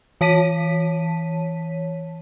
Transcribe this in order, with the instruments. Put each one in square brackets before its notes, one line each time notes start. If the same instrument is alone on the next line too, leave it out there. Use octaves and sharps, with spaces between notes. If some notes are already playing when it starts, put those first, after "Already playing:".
[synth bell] E3 C#5 A5 B6 D#7